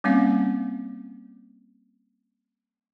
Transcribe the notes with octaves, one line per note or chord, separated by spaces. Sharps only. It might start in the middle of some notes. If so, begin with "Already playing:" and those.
G3 A#3 C4 C#4 F5